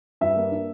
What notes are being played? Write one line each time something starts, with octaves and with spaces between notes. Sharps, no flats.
G2 E5
A#3
D4